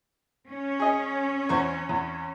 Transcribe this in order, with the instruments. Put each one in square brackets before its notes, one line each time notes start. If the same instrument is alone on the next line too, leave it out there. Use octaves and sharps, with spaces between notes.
[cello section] C#4
[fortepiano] G#4 D#5
E2 C5 C#6
E2